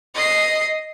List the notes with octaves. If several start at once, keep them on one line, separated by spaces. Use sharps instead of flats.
D#5 C7